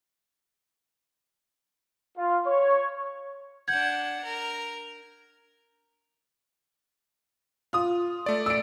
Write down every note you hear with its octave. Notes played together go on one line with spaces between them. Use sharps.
F4
C#5
D4 F#5 G6 G#6
A#4
F4 D#6
A3 D5
E6 D7